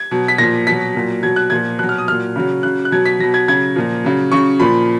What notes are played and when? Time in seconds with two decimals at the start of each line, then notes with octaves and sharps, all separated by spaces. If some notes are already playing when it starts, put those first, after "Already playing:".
Already playing: G#6
0.11 B2 F#3
0.28 B6
0.38 A#2 F3 A#6
0.67 B2 F#3 B6
0.95 A#2 F#3
1.23 B2 F#3 G#6
1.36 F#6
1.50 A#2 F3 G#6
1.79 B2 F#6
1.83 F#3
1.89 F6
1.98 D#6
2.08 A#2 F#3 F6
2.36 C#3 F#3
2.63 C#3 F#3 F#6
2.85 F#6
2.91 B2 F#3 G#6
3.06 B6
3.20 B2 F#3 A#6
3.34 G#6
3.48 C#3 F#3 G#6
3.76 A#2 F3
4.04 C#3 F#3
4.32 C#3 F#3 C#6
4.60 A#2 F3 B5